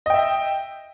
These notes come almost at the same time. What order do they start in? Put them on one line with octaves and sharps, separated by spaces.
D#5 G5 E5